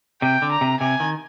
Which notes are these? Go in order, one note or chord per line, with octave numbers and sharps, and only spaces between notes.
C3 G5
D3
A#5
C3
C3 G#5
D#3